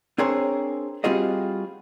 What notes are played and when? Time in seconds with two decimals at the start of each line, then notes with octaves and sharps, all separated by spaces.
0.18 C4 D4 G#4 A#4 C5 C#5
1.04 G3 C4 F4 F#4 G#4 D#5